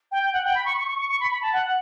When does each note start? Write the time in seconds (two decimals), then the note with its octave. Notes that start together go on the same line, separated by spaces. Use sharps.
0.11 G5
0.22 G5
0.33 F#5
0.44 G5
0.54 B5
0.65 C#6
0.76 C#6
0.87 C#6
0.98 C#6
1.09 C#6
1.20 B5
1.31 B5
1.42 A5
1.52 F#5